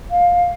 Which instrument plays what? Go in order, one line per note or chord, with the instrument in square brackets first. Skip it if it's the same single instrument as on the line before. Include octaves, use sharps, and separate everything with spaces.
[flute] F5